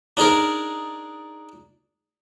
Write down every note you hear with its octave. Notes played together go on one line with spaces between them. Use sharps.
D4 D#4 G#4 A#4